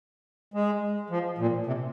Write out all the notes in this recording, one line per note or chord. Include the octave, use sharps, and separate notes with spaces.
G#3
F3
A#2
C3